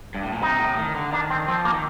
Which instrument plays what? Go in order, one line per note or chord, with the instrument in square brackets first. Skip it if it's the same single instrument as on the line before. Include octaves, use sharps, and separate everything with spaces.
[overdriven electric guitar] G2
A2
A#2
[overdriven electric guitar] C3 [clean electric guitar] D#4
[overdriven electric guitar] A2
D#3
D3
[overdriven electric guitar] D#3 [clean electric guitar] D4
[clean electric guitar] C4
[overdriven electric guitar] F3 [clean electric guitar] C4
[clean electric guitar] A#3
[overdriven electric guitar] D#3